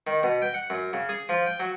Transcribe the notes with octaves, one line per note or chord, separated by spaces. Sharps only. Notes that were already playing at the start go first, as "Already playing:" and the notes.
D#3
B2
G5
F#5
F#2
C#3
G#4
F3
G5
F#3